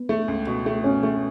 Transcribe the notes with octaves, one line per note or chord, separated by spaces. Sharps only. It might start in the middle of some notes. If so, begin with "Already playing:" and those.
Already playing: B3
A3
C#2
B2
A3
B2 C#4
A3